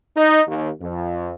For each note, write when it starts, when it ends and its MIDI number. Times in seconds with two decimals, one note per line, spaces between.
0.16 0.42 63
0.47 0.70 39
0.81 1.34 41